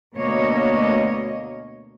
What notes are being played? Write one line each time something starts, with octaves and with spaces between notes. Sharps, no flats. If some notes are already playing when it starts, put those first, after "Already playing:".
D2 B2 A#3 C#5 D#5